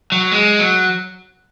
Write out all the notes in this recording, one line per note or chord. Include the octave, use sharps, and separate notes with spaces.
F#3
G#3
F#3